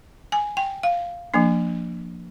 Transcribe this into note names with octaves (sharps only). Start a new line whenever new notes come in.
G#5
G5
F5
F3 A#3 D4